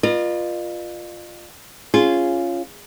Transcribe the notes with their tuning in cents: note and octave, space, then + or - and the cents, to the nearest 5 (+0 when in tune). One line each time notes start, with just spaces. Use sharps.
F4 +0 B4 -40 D#5 -45
C#4 +0 F4 -10 G#4 +0